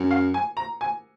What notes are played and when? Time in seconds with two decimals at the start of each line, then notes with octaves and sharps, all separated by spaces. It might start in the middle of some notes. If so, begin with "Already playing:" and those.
Already playing: F#2
0.11 F5
0.34 G#5
0.57 A#5
0.81 G#5